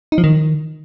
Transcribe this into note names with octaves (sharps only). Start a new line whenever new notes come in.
D#4
F3
D#3